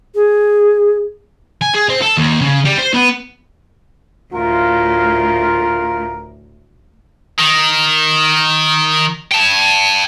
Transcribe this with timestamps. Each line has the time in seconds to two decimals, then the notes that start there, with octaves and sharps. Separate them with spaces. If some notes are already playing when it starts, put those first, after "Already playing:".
0.15 G#4
1.61 G#5
1.74 G#4
1.89 C4
2.02 A4
2.17 D#2
2.41 C#3
2.65 G3
2.78 C5
2.94 B3
4.34 D2 A2 F4 A#4
7.39 D#3
9.31 G5 A5